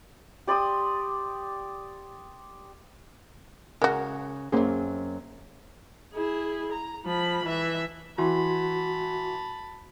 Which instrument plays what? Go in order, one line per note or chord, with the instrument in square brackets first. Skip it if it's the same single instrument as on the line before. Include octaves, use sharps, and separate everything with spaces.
[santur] G4 D5 C6 D#6
[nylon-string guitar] C#3 [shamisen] G#3 F#4 [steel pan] A#4
[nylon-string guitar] F#2 C4 [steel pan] A#3 C#4 G#4
[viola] E4 G#4
A#5
F3 B5
E3 E5
[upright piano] E3 [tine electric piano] F#4 C6 [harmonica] A5 B5